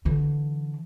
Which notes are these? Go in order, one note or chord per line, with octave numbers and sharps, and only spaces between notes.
D3 E3